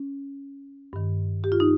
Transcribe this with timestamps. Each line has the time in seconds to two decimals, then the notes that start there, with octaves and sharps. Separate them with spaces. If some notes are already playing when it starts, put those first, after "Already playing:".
Already playing: C#4
0.93 G2 D#3
1.44 G4
1.52 F4
1.60 D#4